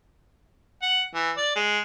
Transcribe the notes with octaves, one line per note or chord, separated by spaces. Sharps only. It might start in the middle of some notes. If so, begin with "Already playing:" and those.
F#5
E3
D5
G#3